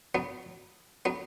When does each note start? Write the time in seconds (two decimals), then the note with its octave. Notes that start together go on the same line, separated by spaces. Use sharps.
0.15 F#3 B3
1.05 F#3 B3